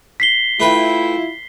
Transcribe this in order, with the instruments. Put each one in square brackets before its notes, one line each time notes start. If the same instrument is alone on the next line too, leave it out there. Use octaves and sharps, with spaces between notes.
[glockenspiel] B6 C7 G7
[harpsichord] A3 B4 G5 [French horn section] E4 F4